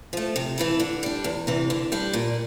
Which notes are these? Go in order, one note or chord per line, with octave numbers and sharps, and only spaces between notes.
F3 A3
C3
E3 A3 E4
D3
G3 D4
E2
C3 E3
D3
G3 D4
A#2